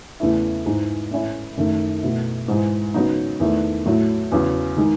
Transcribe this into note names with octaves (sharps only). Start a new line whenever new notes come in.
E2 C#3 E3 A3 E4
G#2 E3 G#3 D#4
A2 E3 A3 C#4 E4
F#2 D#3 A3
B2 A3 E4
G#2 E3 G#3
C#3 F#3 B3 D#4
E2 D#3 A3
A2 F#3 A3
E2 C#3 F#3
D#3 G#3 D#4